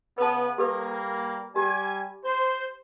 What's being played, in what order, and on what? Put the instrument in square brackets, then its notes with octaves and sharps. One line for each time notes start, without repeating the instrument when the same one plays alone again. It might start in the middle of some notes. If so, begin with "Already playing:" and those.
[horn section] C#3 B3 [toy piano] B4 A5
[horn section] G3 A#3 [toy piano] G4 A4 B4
[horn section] G3 G#5 [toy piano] G4
[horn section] C5